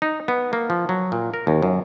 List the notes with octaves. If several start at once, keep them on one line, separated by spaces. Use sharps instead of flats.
D#4
B3
A#3
F3
F#3
A#2
A#4
D#2
F#2